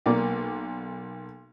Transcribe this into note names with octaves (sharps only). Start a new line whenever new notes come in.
B1 A#3 D5